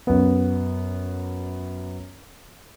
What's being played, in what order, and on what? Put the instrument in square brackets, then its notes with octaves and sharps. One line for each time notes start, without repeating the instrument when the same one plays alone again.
[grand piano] F#2 B3